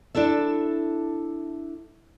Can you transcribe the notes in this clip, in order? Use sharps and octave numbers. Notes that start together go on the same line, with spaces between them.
D4 E4 A4 E5